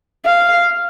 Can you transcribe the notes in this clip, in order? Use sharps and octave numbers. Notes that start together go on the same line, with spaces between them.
F5